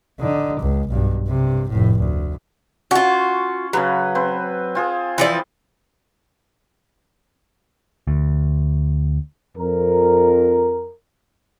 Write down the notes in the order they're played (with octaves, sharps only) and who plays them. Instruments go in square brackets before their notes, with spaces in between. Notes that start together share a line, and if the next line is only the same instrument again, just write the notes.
[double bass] D3 D#4
C#2
B1 G2
G2 C3
F1 A2
D2
[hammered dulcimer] C#4 [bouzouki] F4 F#4
[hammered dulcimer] C#3 B4 [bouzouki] F#3
[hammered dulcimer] C4 B4
C4 F4 G#4
[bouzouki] E3 F3 D5
[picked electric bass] D2
[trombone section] F2 A#4